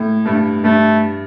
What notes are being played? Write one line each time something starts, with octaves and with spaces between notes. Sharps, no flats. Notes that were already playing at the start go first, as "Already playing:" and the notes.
Already playing: A2
G2 A3
G2 A3